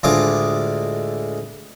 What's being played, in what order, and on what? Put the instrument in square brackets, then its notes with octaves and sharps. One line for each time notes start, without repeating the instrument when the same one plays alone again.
[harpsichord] D2 A2 G#3 F4 D6 D#6